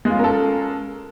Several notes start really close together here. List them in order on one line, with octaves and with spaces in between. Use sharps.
G#3 F4 C#4 A#4 A4